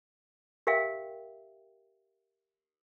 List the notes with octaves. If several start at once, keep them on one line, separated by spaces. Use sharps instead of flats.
G4 A#4 E5 F5 G5